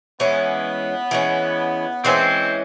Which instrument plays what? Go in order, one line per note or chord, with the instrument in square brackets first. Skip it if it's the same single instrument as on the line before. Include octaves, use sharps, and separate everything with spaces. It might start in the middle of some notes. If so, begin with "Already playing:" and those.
[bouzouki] E3 G#3 C#4 [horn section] B3
[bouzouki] E3 G#3 C#4
[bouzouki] E3 G#3 C#4 [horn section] C4